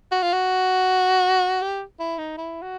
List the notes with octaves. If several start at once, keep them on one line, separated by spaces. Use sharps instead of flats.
F#4
F4
F#4
G4
E4
D#4
E4
F#4